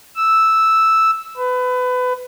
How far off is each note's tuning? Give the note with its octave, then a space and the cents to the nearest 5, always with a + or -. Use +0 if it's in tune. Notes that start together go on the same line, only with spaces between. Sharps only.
E6 -5
B4 +25